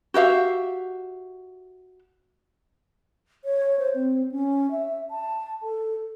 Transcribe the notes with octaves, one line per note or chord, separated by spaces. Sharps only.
F#4 G4 E5 F5
C#5
C5
C4
C#4
E5
A5
A4